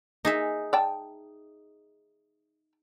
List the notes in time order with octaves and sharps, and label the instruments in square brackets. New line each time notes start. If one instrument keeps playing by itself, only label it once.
[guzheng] D#4 G#4 E5
[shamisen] D5 G5 A5